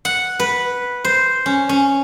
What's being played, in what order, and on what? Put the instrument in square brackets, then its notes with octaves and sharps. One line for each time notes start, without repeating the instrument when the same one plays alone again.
[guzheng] F#5
B4
C5
C#4
C#4